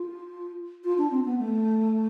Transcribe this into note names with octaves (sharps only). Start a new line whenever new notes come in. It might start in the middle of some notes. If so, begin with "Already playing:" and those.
Already playing: F4
F4
D4
C4
B3
A3